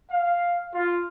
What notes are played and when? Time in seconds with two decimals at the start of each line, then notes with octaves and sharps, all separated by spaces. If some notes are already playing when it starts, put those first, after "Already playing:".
0.11 F5
0.75 F4